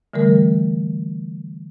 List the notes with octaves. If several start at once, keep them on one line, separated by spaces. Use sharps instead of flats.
D3 E3 G3 A3 A#4